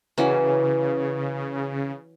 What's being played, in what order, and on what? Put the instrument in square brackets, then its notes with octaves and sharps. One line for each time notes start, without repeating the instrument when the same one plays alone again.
[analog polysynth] C#3 [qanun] E3 F#3 C#4